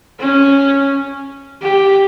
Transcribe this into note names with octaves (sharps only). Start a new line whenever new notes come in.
C#4
G4